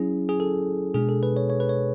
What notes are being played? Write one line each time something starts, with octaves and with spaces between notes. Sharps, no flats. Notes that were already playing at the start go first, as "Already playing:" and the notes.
Already playing: F#3 C#4 E4 G#4
G#4
A4
B2 G#3 D4 G#4
A4
B4
C#5
C#5
B4
C#5